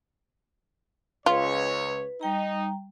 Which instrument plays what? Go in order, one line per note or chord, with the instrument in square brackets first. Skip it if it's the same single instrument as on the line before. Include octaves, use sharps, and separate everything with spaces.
[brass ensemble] C#2 C#3 C#5 [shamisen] F4 [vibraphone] B4
[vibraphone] G3 G5 A#5 [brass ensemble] D#4